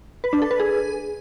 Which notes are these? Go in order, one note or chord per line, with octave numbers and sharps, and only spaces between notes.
B4
D4
A4
B4
G#4